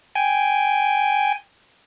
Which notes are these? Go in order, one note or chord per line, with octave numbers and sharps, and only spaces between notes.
G5 G#5